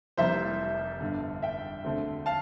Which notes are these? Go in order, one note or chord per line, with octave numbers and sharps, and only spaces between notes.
F1 F2 E3 G3 A#3 C5 E5
G1 G2 D3
E5 G5
E1 D2 D3 A3 C4
F5 A5